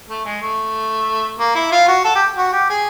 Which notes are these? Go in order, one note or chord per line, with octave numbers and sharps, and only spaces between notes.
A3
G#3
A3
A#3
E4
F4
F#4
A4
G4
F#4
G4
G#4